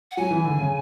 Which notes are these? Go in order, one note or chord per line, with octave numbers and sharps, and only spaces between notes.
F#5
F#3 G#5
E3
D3
C#3